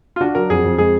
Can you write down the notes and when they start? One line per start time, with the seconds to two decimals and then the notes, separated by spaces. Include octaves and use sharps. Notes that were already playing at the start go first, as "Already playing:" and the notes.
0.16 F4
0.21 D4 F#4
0.35 F#3 A#4
0.50 F2 G#4
0.64 F2
0.78 G#3 G#4